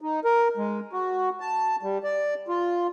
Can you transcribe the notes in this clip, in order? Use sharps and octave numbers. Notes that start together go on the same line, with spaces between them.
D#4
A#4
G#3
F#4
A5
G3
D5
F4